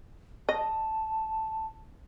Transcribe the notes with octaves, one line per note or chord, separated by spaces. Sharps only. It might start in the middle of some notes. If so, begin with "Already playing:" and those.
D#5 A5